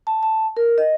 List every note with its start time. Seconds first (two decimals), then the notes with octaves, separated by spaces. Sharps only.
0.07 A5
0.23 A5
0.57 A#4
0.78 D#5